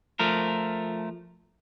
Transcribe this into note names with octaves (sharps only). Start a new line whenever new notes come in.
F3 A3 A#4